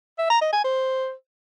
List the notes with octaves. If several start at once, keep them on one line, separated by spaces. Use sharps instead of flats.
E5
A#5
D#5
G#5
C5